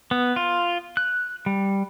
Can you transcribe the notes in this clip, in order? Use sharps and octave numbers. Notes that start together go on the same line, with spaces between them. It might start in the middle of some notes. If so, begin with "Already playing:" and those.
B3
F4
F#6
G3